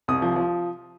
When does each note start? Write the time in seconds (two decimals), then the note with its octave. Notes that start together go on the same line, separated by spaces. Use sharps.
0.08 C2 D#6
0.22 F3
0.36 F3